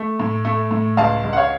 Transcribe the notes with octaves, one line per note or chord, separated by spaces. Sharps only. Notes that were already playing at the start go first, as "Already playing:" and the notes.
Already playing: A3
A2
A3
A2
C#2 F5 A5
C#2
F#5
C#5 F5